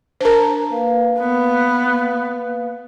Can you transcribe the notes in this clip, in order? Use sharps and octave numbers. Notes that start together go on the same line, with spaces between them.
D4 A#4 C5 A5 A#5
A#3 B4 F5
B3